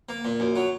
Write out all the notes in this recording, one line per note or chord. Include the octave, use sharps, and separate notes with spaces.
A#3
A#2
F#2
F#3